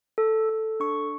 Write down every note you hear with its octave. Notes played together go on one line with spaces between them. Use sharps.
A4
A4
D4 C#6